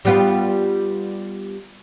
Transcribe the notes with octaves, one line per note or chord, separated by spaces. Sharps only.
G3 B3 F4